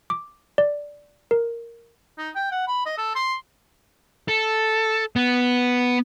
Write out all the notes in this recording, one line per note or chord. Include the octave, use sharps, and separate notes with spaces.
D6
D5
A#4
D#4
G5
F#5
B5
D#5
A4
C6
A4
B3